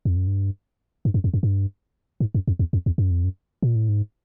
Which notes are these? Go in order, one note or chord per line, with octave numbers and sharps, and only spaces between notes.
F2
F#2
G2
G2
F#2
F2
F#2
G2
G#2
F#2
F2
E2
F2
E2
F#2
F2
F#2
A#2
A2
G#2